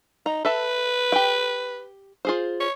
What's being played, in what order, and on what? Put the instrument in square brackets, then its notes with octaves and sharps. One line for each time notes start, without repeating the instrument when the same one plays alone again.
[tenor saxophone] D#4 [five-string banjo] A#5
[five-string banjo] A4 E5 A5 [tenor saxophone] B4
[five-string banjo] G4 G5
F4 G#4 C5
[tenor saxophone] C#5